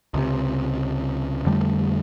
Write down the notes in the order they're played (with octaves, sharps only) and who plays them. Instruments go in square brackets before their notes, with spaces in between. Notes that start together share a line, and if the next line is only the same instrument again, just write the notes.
[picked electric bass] C#2 C3
F2 D3 G3 A3